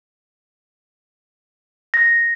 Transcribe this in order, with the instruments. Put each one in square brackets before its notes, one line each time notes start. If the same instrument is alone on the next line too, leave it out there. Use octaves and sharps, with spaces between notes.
[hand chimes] A#6